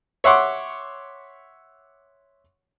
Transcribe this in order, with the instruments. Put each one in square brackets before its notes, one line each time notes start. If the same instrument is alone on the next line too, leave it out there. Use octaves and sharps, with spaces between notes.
[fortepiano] C#5 E5 F#5 C6 D6